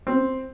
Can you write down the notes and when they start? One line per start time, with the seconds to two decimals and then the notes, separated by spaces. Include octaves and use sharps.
0.07 C4